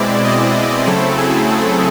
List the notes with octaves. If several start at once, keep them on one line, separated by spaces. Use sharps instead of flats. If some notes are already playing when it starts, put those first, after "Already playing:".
Already playing: B2 G#3 C4 E4 D5
D#5
C#3 F#3 A3 C4 E4 A4
G#4
A4